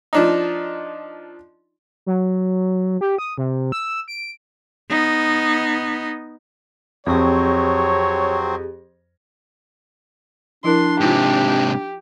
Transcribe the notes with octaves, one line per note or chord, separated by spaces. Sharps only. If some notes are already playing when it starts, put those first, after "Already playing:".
F3 D4 D#4
F#3
G4
D#6
C3
E6
D7
B3 D#4
F2 F#3 C4 G4 G#4 C#5
F3 D4 E4 A#4 C6
G#2 C3 D#4 F4 G4